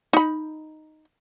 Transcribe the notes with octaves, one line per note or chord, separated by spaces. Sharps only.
D#4 B5